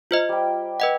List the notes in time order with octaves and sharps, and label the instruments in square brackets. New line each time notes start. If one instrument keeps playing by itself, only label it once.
[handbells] F4 C5 D#5
[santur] G3 G5
[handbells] B4 D#5 F#5